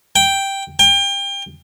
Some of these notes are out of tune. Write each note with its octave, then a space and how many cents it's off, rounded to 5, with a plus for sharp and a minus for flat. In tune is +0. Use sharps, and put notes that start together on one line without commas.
G5 +0
G5 +30